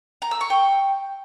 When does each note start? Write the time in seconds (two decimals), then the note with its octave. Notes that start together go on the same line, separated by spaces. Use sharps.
0.22 A#5
0.31 E6
0.41 C#6
0.50 G5